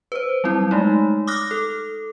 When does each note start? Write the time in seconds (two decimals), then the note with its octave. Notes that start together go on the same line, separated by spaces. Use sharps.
0.12 B4 C5
0.44 F#3 G3 C4 E4
0.71 G#3 A3 D#4
1.27 D6 D#6 F6 F#6 A#6
1.51 A4